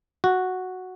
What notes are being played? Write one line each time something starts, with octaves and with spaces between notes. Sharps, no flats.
F#4